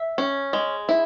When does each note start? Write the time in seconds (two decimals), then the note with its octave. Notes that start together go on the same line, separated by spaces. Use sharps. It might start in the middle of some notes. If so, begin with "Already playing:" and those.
Already playing: E5
0.18 C#4
0.53 G#3
0.89 E4